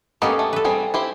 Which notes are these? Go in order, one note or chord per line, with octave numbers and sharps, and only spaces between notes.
A#3 B3 C#4 G4 A4 D#5
A3
A4 B4
G3 C4 G#4
E4 G4 C5